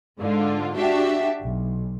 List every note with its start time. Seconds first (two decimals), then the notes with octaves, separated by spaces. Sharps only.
0.20 G#2 D3 F4
0.77 D4 F#4 G4 E5
1.41 B1